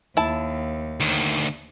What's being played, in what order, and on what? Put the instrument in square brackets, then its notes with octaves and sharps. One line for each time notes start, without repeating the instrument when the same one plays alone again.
[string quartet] D#2 [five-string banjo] E4 A5
[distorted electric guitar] D2 D#3